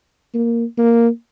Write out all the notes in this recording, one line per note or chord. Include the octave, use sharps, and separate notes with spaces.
A#3
A#3